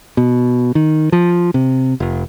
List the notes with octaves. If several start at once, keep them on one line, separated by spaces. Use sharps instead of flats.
B2
D#3
F3
C3
F1